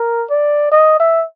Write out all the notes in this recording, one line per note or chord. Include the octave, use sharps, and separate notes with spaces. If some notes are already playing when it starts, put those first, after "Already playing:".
Already playing: A#4
D5
D#5
E5